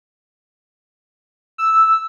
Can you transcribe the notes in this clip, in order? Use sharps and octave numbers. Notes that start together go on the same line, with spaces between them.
E6